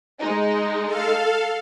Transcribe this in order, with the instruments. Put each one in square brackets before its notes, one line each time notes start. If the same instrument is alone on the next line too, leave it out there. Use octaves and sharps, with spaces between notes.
[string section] G#3 D#4
[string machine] A4 F5